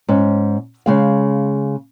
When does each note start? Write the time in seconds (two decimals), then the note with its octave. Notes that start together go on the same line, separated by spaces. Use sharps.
0.08 G#2 C#4
0.86 C#3 G#3 F5